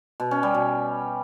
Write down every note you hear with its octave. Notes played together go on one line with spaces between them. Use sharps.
B2
C#4
G3
B2